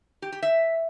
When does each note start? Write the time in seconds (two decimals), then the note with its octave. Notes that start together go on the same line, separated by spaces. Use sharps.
0.22 G4
0.32 G4
0.42 E5